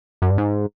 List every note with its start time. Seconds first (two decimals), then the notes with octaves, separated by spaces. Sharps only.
0.22 F#2
0.30 G2
0.38 G#2